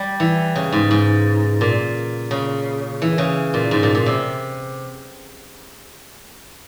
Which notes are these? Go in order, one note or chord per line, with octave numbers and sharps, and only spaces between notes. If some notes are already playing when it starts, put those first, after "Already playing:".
Already playing: G3
E3
C#3
G#2
G#2
A#2
C#3
E3
C#3
A#2
G#2
A#2
A#2
C3